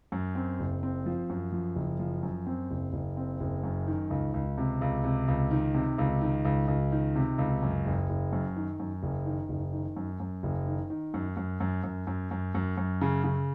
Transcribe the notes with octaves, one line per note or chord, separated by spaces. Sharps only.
F#2
C4
F#1
C4
F3
F#2
F3
F#1
F3
F#2
C4
F#1
F#1
C4
F#1
F#2
D#3
C#2
C#2
C3
C#2
C3
C#2
D#3
C3
C#2
D#3
C#2
C#2
D#3
C3
C#2
F#2
F#1
F#1
F#2
D#3
F#2
F#1
D#3
F#1
D#3
F#2
F#2
F#1
D#3
D#3
F#2
F#2
F#2
F#2
F#2
F#2
F#2
F#2
C#3
C#3